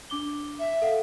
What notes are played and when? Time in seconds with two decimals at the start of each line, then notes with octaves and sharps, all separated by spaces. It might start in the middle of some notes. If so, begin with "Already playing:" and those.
0.10 D4 D6 G7
0.58 E5
0.82 A4 F5 F#5